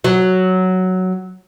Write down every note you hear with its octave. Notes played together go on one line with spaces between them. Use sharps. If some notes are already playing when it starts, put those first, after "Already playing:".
F#3